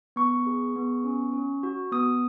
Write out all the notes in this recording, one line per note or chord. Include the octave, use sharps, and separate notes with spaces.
B3 C#6
G#4
B3
C#4
C#4
F#4
B3 D#6